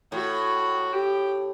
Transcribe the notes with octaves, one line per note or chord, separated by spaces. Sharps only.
A2 F#4
G4